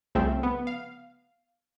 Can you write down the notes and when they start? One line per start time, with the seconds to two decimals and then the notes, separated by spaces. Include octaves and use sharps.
0.15 C2 C#3 F3 A3 C4
0.43 B3
0.67 F5